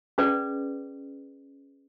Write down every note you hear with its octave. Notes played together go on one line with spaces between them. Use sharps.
C#4 G#4 B4 D5